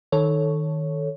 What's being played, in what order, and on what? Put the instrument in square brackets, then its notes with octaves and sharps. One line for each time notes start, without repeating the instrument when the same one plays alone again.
[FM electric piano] D#3 A4 C#5